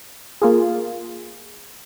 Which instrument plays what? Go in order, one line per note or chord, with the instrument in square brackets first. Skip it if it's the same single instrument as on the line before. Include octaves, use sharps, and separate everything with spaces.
[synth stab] A#3 F4 G#4